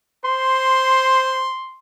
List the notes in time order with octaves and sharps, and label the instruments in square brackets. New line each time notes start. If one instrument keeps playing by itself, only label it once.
[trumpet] C5 [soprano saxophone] C6